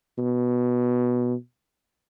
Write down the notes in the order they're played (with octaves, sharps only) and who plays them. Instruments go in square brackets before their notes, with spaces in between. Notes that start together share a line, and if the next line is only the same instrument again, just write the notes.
[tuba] B2